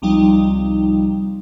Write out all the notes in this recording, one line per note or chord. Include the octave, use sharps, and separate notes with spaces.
C2 F3 G3 D#4